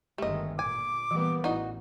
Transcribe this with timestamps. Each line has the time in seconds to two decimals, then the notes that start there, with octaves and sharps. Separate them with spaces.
0.18 G1 D#3 G#3 A3 G4 D#5
0.59 A#2 G#5 D6
1.11 E3 G3 A#3 B3
1.44 A1 D#4 E4 F#4 D5